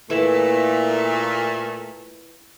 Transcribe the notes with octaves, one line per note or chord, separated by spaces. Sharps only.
A#2 E3 A3 E4 A5